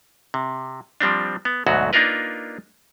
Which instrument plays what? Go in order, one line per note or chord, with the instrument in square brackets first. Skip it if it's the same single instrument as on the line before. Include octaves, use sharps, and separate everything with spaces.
[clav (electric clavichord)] C3
F3 G3 C4 D4
B3
D2 G#2 B2 F#3 F#4
A#3 D4 D#4 F4 A#4 B4